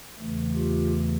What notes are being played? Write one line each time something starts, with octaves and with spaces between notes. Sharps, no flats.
E2 C#3 E3 A3
F4 G4